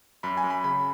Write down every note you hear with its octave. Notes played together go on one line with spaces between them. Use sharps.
F#2 B5
G#5
F#2
B5
C#3 B5